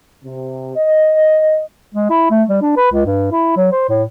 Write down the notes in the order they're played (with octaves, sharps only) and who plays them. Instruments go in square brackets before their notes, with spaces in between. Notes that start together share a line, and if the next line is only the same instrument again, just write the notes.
[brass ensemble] C3
D#5
[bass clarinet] G#3
E4
A3
G3
D4
B4
C#2
G2
E4
F#3
C5
A2